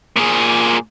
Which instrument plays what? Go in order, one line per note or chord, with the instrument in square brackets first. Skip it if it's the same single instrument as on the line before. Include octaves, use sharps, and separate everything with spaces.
[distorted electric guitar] A#2 G#4